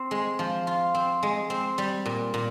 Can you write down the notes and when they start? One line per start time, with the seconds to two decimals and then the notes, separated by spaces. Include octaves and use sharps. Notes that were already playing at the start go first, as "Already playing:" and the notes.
Already playing: C4
0.11 G#3
0.39 F3
0.67 F4
0.94 C4
1.23 G#3
1.50 C4
1.78 G3
2.06 A#2
2.34 A#2